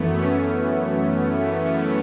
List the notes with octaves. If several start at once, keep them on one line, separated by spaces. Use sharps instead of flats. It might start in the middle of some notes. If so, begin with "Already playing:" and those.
Already playing: F#2 E3 A3 B3
C#4